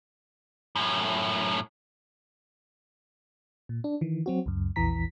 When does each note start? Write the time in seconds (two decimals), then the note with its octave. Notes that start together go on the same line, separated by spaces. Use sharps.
0.76 F#2 A2
3.69 A#2
3.84 D4
4.01 D#3 E3
4.26 F#3 C4 F#4
4.46 C#2 F#2
4.76 A#1 E2 E3 A#5 B6